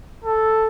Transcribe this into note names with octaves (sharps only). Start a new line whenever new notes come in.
A4